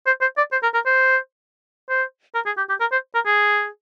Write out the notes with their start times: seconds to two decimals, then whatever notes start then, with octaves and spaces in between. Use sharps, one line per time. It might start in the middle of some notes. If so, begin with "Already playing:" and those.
0.07 C5
0.21 C5
0.37 D5
0.52 C5
0.63 A#4
0.74 A#4
0.86 C5
1.89 C5
2.35 A#4
2.46 G#4
2.57 G4
2.69 G4
2.80 A#4
2.92 C5
3.15 A#4
3.26 G#4